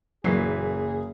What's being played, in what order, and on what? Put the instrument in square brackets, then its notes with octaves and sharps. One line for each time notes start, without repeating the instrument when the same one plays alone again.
[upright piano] F#1 C7 [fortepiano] A#2 E3 [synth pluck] F#3 [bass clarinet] G#4